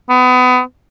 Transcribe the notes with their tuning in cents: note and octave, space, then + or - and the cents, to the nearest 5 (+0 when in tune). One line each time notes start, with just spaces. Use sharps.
B3 +30